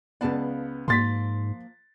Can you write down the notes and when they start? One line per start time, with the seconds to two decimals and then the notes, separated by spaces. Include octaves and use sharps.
0.21 C#2 B3 D5 F5 A5
0.88 G#2 F3 A#3 C6 A6 B6